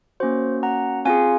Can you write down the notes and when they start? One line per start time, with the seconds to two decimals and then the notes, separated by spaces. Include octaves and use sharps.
0.20 A#3 C#4 F#4 C5
0.63 F#5 A#5
1.05 C4 F4 G#4 F5 G#5